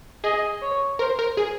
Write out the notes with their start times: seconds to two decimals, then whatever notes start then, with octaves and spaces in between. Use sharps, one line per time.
0.24 G#4 D#5
0.62 C#5
0.99 A#4 C5
1.19 A#4
1.37 G#4